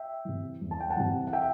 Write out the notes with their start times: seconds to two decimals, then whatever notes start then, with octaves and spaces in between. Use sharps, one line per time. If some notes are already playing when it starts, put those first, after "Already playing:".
Already playing: E5 G5
0.25 C3 E3
0.61 E2
0.71 A5
0.80 G5
0.90 F#5 A5
0.97 C3 E3
1.27 F#5
1.33 E5 G5